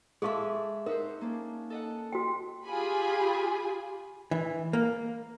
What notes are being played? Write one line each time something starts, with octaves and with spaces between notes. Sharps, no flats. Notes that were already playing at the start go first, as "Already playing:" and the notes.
G#3 G#4 A4 E5 F5 C#6 D6
D#4 A#4 C5 E5 F#5
A#3 C#4 D4
A4 D#5 F#5
F#4 G5
F4 G4 G#4 G#5 B5
E3
A#3